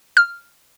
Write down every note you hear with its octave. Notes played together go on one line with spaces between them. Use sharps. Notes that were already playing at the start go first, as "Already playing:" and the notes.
F6